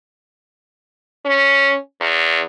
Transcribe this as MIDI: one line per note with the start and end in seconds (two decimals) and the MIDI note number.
1.26 1.76 61
2.01 2.42 40